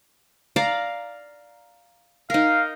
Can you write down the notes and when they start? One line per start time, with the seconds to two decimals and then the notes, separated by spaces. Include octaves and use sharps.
0.56 D5 F5 A#5
2.30 D#4 A#4 F5